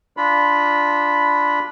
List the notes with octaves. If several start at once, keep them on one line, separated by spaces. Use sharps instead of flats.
D4 F4 B5